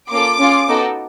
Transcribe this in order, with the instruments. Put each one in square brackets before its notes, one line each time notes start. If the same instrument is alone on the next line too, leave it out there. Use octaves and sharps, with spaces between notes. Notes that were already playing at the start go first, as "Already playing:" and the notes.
[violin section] A#3 C#4 F4 A4 D6
C#4 F4 G#4
B3 D#4 F#4 A4